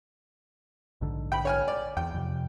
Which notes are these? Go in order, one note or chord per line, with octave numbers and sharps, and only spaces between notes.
A#1 G#2 D3
G5 B5
C#5 G#5 F6
D5
E2 G5
F2 C3